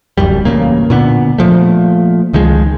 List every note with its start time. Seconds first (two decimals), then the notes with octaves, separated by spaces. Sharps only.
0.18 D1 F#2 G3
0.45 A1 A#2 C#3 A#3
0.90 A#2 D3 B3
1.38 A#2 F3 A3
2.33 C#2 D#3 F3 G#3